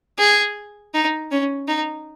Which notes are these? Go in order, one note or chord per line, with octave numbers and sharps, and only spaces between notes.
G#4
D#4
C#4
D#4